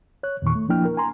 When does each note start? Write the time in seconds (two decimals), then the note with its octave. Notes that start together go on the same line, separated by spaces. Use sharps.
0.23 C#5 F#6
0.42 E2 A#2 D#3 C#6
0.55 A3
0.69 F3 A#3 D4 E4 G5 F6
0.85 A#4
0.97 G#5 A#5 C6